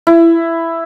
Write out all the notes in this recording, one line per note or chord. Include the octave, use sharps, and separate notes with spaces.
E4